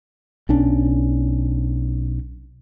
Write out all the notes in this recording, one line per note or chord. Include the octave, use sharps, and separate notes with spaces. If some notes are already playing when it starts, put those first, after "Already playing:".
B1 C#4 D4